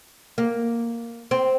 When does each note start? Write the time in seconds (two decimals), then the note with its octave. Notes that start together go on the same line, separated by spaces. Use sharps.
0.38 A#3
1.31 C4